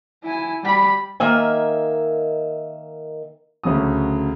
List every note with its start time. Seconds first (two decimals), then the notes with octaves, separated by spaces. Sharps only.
0.24 E4 G#5
0.64 G3 B5
1.20 D#3 A#3 E5 G#5
3.63 D2 C#3 F#3 F#4 D#6